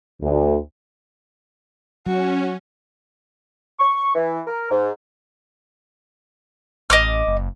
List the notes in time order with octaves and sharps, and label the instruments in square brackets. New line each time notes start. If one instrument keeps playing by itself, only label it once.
[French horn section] D2
[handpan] F#3 [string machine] C#4 [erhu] F#4
[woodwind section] C#6
E3
A#4
G#2
[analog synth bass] A1 [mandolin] D#5 D6 F6
[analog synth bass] F#1